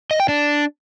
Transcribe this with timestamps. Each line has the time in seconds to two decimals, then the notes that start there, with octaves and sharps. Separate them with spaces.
0.11 D#5
0.20 G5
0.29 D4